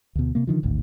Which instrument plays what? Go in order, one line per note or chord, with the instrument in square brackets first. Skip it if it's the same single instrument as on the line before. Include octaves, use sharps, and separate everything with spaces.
[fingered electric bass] D2 B2
C3 A#3
D3 D#3 F3
D1 G#1 D2